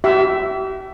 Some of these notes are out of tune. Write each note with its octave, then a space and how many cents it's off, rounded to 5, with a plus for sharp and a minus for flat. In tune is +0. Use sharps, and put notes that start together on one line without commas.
G4 -40 E5 +10